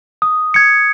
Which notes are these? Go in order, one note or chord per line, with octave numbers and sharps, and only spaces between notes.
D#6
G#6 C#7